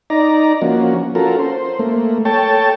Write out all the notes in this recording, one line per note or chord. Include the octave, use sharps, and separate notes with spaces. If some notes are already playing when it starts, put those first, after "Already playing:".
D#4 D5 A#5
F3 A#3 C#4 F#4
C#4 F4 F#4 A4 A#4
C5
A3 A#3
A4 C#5 G5 A5